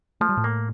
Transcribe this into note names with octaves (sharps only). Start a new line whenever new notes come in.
F3 A3
G3
A2 A3
A#3